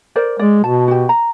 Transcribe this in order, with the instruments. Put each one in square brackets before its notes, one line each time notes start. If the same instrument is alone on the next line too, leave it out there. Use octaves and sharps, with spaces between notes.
[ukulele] A#4 C5 D5
[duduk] G#3 [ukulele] D5
[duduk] B2 [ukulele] A5
[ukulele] F#4 G4
A#5